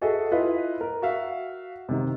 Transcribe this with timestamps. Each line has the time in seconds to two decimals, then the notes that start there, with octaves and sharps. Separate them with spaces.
0.01 F#4 G#4 A4 D#5 E5
0.31 E4 F4 B4 D#5 E5
0.81 A#4
1.02 F#4 E5 F5
1.89 C3 D#3